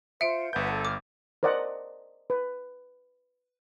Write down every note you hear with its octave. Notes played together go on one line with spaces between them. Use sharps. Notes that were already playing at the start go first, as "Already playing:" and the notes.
F4 C5 E5 C#7 D7
G1 B4 F#5 A5 G6
A4
D6 F6
A#4 C5 D5 D#5 F#5
B4